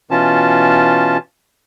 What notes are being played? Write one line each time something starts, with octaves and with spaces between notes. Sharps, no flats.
B2 E3 C#4 F4 A5